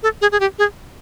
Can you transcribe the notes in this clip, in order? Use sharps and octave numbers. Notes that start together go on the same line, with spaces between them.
A4
G#4
G#4
G4
G#4